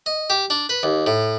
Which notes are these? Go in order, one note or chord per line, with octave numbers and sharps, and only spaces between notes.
D#5
G4
D4
B4
D#2
A2